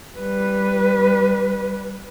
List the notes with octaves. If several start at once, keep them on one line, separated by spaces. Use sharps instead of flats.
G3 B4